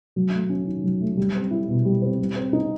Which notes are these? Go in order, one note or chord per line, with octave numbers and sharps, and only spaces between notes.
F#3
A3
C#4
D#3
F#3
A3
G3
C4
E4
B2
G3
C4
G3
C4
D#4